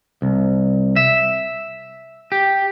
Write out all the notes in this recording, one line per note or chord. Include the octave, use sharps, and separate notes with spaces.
C2
E5
G4